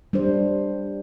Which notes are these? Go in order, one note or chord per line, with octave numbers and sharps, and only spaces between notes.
G3 D4 C5